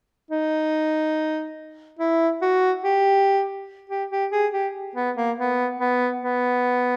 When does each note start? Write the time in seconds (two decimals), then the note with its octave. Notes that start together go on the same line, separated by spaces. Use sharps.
0.31 D#4
1.99 E4
2.42 F#4
2.84 G4
3.89 G4
4.11 G4
4.32 G#4
4.53 G4
4.95 B3
5.17 A#3
5.38 B3
5.80 B3
6.22 B3